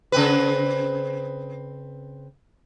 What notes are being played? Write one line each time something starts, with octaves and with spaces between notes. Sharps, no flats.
C#3 C4 B4